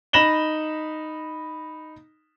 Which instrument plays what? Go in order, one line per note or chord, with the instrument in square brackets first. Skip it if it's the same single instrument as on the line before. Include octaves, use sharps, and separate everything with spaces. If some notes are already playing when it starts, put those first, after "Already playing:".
[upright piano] D#4 B5 A#6 E7 F#7 G7